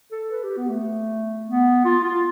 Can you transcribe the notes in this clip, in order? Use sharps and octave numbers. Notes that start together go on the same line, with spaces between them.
A4
B4
G4
B3
A3
B3
F4
F4